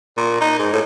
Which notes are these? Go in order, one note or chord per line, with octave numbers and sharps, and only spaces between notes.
A#2
D#4
G#2
A2